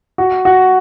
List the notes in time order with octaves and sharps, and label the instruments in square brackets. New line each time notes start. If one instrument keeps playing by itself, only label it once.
[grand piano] F#4
F#4